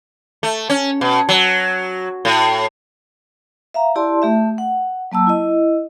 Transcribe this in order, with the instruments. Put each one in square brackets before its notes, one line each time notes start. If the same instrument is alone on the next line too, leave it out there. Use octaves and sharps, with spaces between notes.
[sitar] A3
C#4
B2
F#3
A2
[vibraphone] E5 F5 A#5
E4 G4 D5 A5 C6
A3 G4 E5
F#5
F#3 A#3 A5 E6
E4 D#5